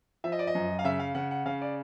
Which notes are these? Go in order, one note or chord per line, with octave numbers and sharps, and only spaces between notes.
F3 E5
D#5
D5
D#5
F#2
F5
C#3 E5
F5
C#3 F#5
F#5
C#3 F5
D5